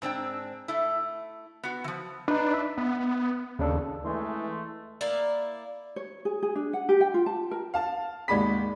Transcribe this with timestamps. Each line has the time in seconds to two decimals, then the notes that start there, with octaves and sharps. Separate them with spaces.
0.02 G#2 C4 D4 G5
0.68 A3 E4
1.63 B3 F#4
1.84 E3 F3
2.28 D4 D#4 B4
2.54 E5
2.77 B3
3.59 D#2 C#3 D4 A4
4.05 E3 G#3 A3
5.01 A#3 E4 D5
5.96 C#5
6.25 G#4
6.43 G#4
6.56 D4
6.73 F#5
6.89 G4
7.01 G5
7.14 F4
7.26 A5
7.51 A#4
7.74 F5 A5
8.28 G#1 D#2 G#3 D5 B5 B6